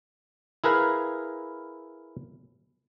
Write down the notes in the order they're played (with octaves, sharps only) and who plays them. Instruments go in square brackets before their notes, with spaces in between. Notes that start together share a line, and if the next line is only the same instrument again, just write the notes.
[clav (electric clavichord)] E4 G#4 A#4 B4 F5